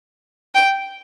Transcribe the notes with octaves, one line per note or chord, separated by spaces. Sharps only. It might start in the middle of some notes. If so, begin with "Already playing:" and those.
G5